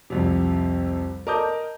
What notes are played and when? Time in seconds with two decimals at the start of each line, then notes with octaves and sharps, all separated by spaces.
0.10 C2 F2 C3
1.27 A#4 D#5 A5 D6 D#6 G6